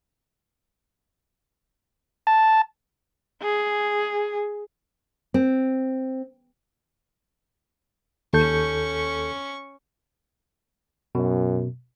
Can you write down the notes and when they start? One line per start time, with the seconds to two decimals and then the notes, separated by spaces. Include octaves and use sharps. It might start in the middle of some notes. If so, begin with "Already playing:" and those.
2.27 A5
3.42 G#4
5.34 C4
8.33 D#2 C#4 A4 C#6 G6
11.15 F#2 B2